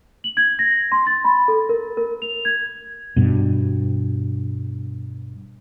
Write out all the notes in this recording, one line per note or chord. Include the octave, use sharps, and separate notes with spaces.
F#7
G#6
A#6
C6
A6
B5
A4
A#4
A#4
F7
G#6
G2 B2